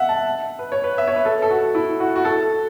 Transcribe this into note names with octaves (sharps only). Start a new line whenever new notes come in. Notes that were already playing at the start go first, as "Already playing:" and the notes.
Already playing: E5 F#5
A5
B4
C#5
B4
E5
C#5
B4
A4
A4
F#4
E4
F#4
F#4
A4